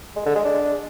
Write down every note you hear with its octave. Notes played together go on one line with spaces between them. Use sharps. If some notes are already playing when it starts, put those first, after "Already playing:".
G#3
D3
G#3
D4